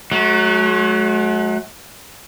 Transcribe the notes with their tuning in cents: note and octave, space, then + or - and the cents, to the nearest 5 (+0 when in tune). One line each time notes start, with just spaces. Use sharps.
F#3 +0 A3 -45